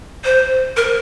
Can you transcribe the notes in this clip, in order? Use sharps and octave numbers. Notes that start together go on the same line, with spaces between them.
C5
A#4